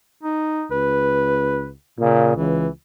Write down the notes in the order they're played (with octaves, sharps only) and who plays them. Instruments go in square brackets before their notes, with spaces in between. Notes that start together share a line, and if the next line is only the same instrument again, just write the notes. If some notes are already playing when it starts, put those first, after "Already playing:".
[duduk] D#4
[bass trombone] C#2 [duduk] B4
[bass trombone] A#2 [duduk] C#3
[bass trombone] C#2 [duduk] E3